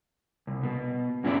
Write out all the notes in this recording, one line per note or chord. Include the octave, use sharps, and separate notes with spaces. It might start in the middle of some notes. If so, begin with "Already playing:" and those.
C2
B2
G2 C#4 E4 G4 D5